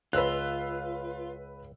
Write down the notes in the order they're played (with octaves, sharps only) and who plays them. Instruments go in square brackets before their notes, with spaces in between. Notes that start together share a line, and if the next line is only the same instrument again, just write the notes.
[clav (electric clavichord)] C#2 [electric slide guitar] F4 [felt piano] B4 E6 F#6